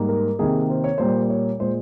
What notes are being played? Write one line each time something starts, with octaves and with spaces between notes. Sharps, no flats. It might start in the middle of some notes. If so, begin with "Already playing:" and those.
Already playing: G#2 G3 A#3
A#4
C3 D#3 A#3 G#4
C5
C#5
A#2 G3 A#3 C5
C#5
A#2 G#3 C5